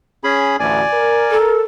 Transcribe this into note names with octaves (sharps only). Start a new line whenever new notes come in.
C#4 G#4 B5
A1 D2 D5 G#5
A#4
A4